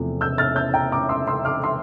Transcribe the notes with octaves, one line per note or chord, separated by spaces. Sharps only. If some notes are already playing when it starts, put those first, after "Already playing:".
Already playing: E2 C3 F3 A3
E6 G6
F6 A6
E6 G6
G5 A#5
A#5 D6
C6 E6
C6 E6
D6 F6
C6 E6